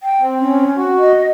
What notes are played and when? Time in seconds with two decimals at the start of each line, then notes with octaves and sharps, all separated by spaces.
0.03 G5
0.22 C4
0.40 C#4
0.77 F#4
0.98 D#5